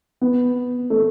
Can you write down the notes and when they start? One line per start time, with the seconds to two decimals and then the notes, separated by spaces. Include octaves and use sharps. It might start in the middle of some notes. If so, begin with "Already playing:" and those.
0.21 B3
0.90 A3